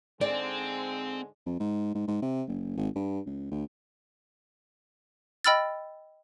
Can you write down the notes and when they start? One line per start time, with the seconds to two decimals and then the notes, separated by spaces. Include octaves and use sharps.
0.21 G#2 D3 G#3 C4 D5
1.46 F2
1.60 G#2
1.95 G#2
2.07 G#2
2.22 C3
2.48 F#1
2.77 G#1
2.96 G2
3.26 C#2
3.51 D2
5.45 D#5 G5 B5 E6 F6 A6